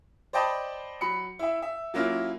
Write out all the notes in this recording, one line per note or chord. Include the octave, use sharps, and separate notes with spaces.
C5 D5 D#5 G5 A5 B5
F#3 B5 C#7
E4 E5
E5
F#3 A#3 C#4 E4 F4